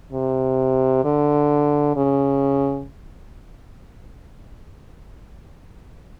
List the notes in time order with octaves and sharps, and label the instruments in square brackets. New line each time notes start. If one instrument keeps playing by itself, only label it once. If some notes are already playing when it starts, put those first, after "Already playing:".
[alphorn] C3
D3
C#3